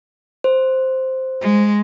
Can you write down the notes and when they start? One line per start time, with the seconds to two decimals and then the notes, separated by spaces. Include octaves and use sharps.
0.44 C5
1.42 G#3